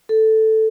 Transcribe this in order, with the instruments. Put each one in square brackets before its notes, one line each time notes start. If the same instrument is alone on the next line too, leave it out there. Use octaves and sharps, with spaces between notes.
[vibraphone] A4